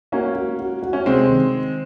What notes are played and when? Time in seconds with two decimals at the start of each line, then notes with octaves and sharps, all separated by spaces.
0.12 A#3 C#4 F#4
0.35 F#4
0.59 F#4
0.83 F#4
0.93 C#4
1.05 C3 G#3 C4
1.29 D#3